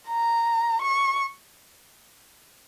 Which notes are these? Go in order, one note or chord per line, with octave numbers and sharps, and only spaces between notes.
A#5
C#6